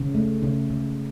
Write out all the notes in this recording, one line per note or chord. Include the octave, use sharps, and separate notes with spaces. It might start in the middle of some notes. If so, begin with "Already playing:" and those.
Already playing: C#3
A3
C#3
C#3